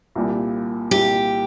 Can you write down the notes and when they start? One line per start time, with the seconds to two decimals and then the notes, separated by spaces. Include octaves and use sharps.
0.16 C2 A#2 G3
0.91 C2 A#2 G3 G4